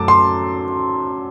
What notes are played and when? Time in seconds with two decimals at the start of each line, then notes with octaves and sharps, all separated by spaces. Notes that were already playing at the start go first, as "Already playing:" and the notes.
Already playing: F#2 F#3 A3 A5 D6
0.08 C6